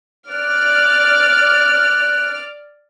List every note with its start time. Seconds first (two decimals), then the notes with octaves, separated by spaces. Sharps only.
0.31 D5 F6 F#6